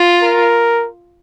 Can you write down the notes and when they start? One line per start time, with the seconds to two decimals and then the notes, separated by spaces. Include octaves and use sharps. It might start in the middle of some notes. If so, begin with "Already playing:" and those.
Already playing: F4
0.22 A#4